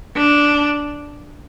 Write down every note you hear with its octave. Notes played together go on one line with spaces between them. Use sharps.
D4